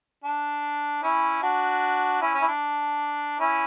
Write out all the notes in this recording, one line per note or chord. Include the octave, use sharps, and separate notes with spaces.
D4
C#4 E4
D4 F#4
C#4 E4
C#4
E4
D4
C#4 E4